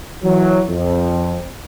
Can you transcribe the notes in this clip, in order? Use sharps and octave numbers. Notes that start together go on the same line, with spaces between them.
E3 F#3
F2